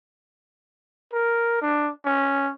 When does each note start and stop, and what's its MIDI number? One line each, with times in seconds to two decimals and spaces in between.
1.13 1.58 70
1.62 1.91 62
2.05 2.51 61